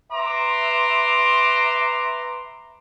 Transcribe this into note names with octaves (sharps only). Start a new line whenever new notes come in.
B4 E5 A#5 C6 D6